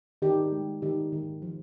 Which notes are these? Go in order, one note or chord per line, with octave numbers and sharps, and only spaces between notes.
D#3 D#4 G4
G#3
D#3 D#4 G4
D#3
F3